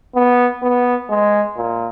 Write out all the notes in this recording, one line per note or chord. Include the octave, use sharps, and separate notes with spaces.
B3
B3
G#3
A#2